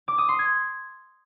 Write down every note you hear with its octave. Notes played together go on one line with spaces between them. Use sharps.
D6
D#6
C6
G#6